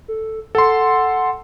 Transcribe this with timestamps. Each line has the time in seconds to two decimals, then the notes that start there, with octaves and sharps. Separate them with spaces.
0.08 A4
0.55 A4 F#5 C6